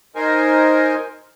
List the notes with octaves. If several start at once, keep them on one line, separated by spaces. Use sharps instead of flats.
D#4 A#4 C5 G#5